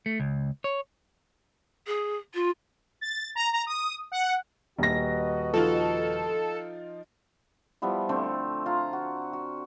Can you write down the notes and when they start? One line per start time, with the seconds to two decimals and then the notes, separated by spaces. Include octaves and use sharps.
0.06 A3
0.20 C#2
0.64 C#5
1.87 G#4
2.34 F4
3.01 A6
3.35 A#5
3.53 A#5
3.67 D#6
4.12 F#5
4.79 D#1 F#4 B4 D#5 A#6
5.54 F3 D#4 F4 A4
7.82 F3 G3 B3 E4
8.09 D3 A3 C4
8.66 F4 A#5
8.93 F#4
9.33 F#4